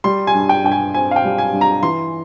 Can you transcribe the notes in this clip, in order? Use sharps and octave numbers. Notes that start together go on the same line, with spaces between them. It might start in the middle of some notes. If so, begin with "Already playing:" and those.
G3 C6
G#5
G2
G5
G2 G5
G#5
C4 G#5
F5
G5
G3
G#5
G2
A#5
E3 C6